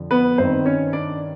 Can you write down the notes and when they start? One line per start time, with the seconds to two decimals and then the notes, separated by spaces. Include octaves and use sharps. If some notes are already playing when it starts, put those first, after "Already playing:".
Already playing: F2 D3 F3
0.11 B3 B4
0.38 G2 D#3 C4 C5
0.66 C#4 C#5
0.93 D4 D5